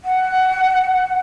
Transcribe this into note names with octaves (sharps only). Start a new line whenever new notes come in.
F#5